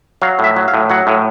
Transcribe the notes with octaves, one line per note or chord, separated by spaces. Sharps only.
F#3 F5
A2 E5
F#3
F5
A2
F#3 F#5
A2